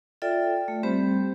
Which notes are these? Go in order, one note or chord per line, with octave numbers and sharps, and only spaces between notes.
F4 A4 D5 E5 G5
A3
G3 C4 G4 C5 B5